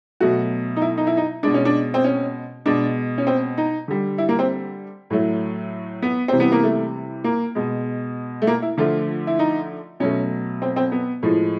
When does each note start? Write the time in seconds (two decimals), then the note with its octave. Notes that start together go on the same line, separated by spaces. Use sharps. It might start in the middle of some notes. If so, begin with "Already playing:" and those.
0.20 B2 F#3 A3 F#4
0.76 D#4
0.82 E4
0.97 D#4
1.07 E4
1.17 D#4
1.43 B2 G#3 D4
1.54 C#4
1.65 D4
1.94 C4
2.04 C#4
2.65 B2 G#3 D4
3.18 C#4
3.27 C4
3.58 D#4
3.88 D3 G3
4.18 E4
4.29 A#3
4.39 C4
5.10 A2 F#3 A3
6.02 B3
6.28 C3 E3 G3 C4
6.40 B3
6.52 A#3
6.63 A3
7.24 A#3
7.55 B2 G#3
8.42 A3
8.47 A#3
8.62 E4
8.78 D3 F3 A3 F4
9.27 E4
9.39 D#4
10.00 B2 F#3 A3 C#4
10.62 C4
10.76 C4
10.92 B3
11.23 A2 F3 G#3